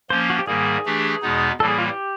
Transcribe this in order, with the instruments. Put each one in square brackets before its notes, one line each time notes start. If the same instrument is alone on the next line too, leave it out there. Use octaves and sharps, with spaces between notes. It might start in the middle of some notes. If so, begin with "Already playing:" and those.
[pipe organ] F3 A#3 C#4 [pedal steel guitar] C5
[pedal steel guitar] F#4
G4
[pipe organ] G#2 D#3 G3 A#3 [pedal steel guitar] G#4
[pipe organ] E3 A3 D4 G4
E2 B2 G#3 B3 D#4
[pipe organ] A2 E3 G3 A#3 [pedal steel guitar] A4
[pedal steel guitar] G#4
F4
G4